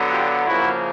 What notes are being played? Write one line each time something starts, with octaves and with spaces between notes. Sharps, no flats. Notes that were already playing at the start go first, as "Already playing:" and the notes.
Already playing: D3 F#3 B3
F4 G4
C#3 F3 A#3 E4 F#4